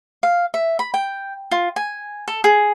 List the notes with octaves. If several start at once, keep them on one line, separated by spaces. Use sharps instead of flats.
F5
E5
B5
G5
F4
G#5
A4
G#4